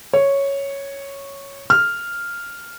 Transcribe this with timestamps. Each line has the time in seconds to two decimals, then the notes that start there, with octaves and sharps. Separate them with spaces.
0.13 C#5
1.70 F6